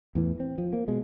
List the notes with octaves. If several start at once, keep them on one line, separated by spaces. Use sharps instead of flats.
E2 A2 E3
C4
F3
A#3
B2 G#3